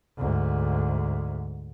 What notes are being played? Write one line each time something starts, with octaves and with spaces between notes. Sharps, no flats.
D2 G#2